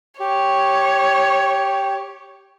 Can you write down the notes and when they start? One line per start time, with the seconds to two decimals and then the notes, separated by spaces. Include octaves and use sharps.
0.20 G4 C#5